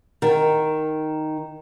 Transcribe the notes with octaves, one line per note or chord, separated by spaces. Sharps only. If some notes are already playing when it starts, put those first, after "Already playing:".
D#3